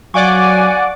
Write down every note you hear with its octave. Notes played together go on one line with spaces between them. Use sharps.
F#3 D5 F5 F#5 G#5 C#6 D6